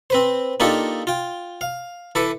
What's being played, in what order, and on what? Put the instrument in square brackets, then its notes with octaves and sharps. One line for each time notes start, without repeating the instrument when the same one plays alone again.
[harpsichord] C4 B4 C5
A#3 D4 D#4 F4 G4 A4
F4 G5
F5
E3 A4 B4 D6